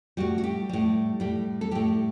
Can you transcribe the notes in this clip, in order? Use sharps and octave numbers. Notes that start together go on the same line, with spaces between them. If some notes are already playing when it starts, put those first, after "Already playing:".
A2 G3 F#4
F#4
G4
A2 G3
A2 G3
A4
A2 G3 G4